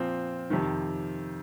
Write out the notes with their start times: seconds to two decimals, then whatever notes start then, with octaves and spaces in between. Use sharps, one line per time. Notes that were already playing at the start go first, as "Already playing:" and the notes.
Already playing: A#2 F3 C4
0.50 F2 C3 D#3